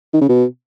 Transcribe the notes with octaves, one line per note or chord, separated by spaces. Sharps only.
D#3
C#3
B2